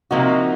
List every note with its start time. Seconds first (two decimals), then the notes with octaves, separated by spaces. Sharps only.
0.11 C3 F3 A#3 C4 D#4 F#4